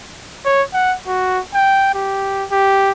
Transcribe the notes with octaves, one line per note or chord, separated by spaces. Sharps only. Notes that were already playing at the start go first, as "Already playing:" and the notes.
C#5
F#5
F#4
G5
G4
G4